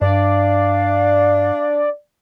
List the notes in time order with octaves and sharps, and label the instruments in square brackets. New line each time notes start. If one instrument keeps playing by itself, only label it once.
[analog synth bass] G2 [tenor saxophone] D4 [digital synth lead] D5 [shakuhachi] F5